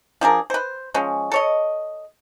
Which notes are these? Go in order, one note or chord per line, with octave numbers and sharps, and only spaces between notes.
F3 D4 G#4 A#4
B4 C5
F3 G#3 C#4
A4 C#5 D#5